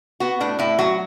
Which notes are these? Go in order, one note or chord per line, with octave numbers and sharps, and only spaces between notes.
B3 F#4
A2 D4
A2 E4
F#3 F#4